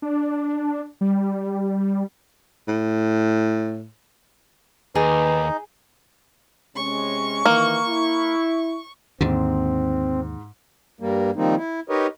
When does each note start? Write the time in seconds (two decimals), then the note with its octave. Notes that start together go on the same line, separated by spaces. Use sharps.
0.02 D4
1.01 G3
2.68 A2
4.95 D#2 D#4 G#4 B4
6.76 C3 G#3 C#4 C#6
7.46 D#3 E3 A#3
7.87 E4
9.21 D#2 G#2 D3 C4
11.00 G2 G3 A#3
11.36 D#3 F3 G3 A#3 C4 D#4
11.57 E4
11.89 D#4 G4 A#4 B4 C#5 D#5